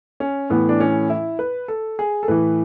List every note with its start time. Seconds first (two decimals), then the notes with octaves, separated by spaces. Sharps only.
0.20 C#4
0.50 A2 E3 B3
0.69 D4
0.80 C#4
1.10 E4
1.39 B4
1.68 A4
1.99 G#4
2.23 A4
2.28 A2 E3 B4